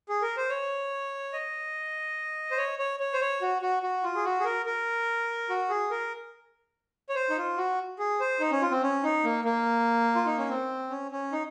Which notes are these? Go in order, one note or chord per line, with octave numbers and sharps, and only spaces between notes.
G#4
A#4
C5
C#5
D#5
C5
C#5
C#5
C#5
C5
C#5
F#4
F#4
F#4
F4
G#4
F#4
G#4
A#4
A#4
F#4
G#4
A#4
C#5
C5
D#4
F4
F#4
G#4
C5
D#4
C#4
F4
C4
C#4
D#4
A#3
A#3
F4
D#4
C#4
C4
C#4
C#4
D#4